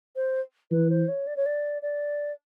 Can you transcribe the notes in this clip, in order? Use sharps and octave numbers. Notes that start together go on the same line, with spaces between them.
C5
E3 B4
C5
C#5
D5
C#5
D5
D5